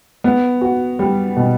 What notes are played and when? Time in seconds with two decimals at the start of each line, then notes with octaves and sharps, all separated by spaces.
0.24 B3
0.61 F#4
0.99 G3
1.37 B2